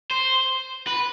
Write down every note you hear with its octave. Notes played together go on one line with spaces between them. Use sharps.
C5
B4